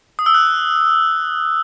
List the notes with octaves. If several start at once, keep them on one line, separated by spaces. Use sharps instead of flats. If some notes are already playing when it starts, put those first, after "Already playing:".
D#6
E6
F#6